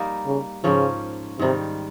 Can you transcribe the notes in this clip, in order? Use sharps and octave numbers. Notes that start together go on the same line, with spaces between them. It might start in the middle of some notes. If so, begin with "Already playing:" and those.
Already playing: G3 A#3 D#4
C#3
G#2 C#3 F3 A#3 C#4
G#2 C3 D#3 G3